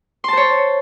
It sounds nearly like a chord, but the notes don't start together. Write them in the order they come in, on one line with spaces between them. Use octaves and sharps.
C6 A5 C5 C#5